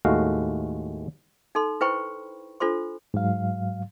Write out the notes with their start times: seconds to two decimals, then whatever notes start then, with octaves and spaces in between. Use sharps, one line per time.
0.05 D#2 A2 G#3 A3 F#4 F5
1.55 D#4 A4 C6
1.81 E4 B4 C5 G5 B5 C#6
2.60 D4 F4 A4 C5 C6
3.14 G#2 F#3 F5